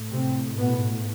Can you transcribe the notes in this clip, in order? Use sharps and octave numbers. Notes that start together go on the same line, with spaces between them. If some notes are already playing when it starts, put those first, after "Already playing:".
Already playing: A2
C3 C4
B2 B3